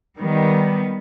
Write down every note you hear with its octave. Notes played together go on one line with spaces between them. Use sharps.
D#3 G3 B3